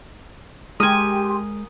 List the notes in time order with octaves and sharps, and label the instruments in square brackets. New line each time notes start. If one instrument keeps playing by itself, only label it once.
[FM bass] G#3 [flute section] G4 C6 [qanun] A#4 G#5 [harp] D#6